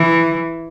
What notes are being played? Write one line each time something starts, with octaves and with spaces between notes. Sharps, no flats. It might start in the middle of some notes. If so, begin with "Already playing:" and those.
Already playing: E3